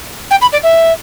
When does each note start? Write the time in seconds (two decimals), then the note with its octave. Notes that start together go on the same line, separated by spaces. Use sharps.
0.30 G5
0.41 B5
0.52 D5
0.63 E5